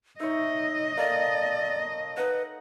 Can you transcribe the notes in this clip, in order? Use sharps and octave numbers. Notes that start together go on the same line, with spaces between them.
D#4 C#5 D#5 E5
A#3 D#4 A4 D5
D#4 B4 F#5